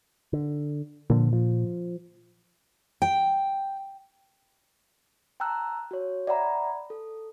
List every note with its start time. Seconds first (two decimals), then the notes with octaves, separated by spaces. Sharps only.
0.33 D3
1.10 A#2 D3 E3 F3
1.33 F3
3.02 G5
5.40 G5 A5 A#5 E6 F#6
5.91 F#4 C#5
6.27 D5 E5 F#5 G5 A#5 B5
6.90 A4